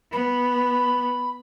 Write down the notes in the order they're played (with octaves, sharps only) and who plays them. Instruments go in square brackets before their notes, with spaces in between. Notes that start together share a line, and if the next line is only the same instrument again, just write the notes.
[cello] B3 [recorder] B5